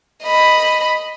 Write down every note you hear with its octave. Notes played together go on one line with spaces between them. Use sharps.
D#5 B5